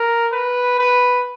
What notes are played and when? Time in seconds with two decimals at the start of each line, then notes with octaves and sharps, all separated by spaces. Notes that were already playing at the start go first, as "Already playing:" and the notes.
Already playing: A#4
0.32 B4
0.79 B4